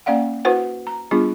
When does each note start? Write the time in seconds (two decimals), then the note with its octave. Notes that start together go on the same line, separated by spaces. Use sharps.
0.06 A#3 C#4 D5 F5 F#5
0.45 E4 F#4 B4 C5 F#5
0.87 A#5
1.11 G3 B3 D4 F4 G#4